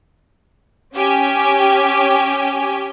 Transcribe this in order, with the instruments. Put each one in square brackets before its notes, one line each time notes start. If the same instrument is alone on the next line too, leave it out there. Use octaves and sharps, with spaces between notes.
[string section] C#4 G4 G#5